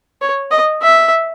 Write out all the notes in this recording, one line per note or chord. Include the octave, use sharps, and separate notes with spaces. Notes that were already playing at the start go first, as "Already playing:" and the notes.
C#5
D#5
E5